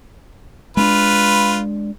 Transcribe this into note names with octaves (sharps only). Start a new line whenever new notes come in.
G#3 C#4 D4 F4 B4